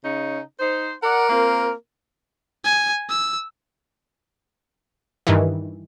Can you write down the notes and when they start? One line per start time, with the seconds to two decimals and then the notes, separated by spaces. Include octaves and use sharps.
0.04 C#3 C#4 D#4
0.60 D#4 C5
1.03 A#4 D5 F#5
1.29 A#3 C4 F4
2.64 G#5
3.09 E6
5.27 G2 D#3 E3